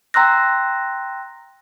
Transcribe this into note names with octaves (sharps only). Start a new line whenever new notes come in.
G5 A#5 C6 E6 F#6 A#6